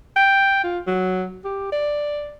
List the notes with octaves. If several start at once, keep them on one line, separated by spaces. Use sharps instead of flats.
G5
F4
F#3
G4
D5